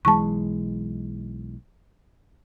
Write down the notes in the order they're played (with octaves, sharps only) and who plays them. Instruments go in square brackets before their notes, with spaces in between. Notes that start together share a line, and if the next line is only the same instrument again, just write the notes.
[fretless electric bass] B1 E3 G#3 [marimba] A5 C#6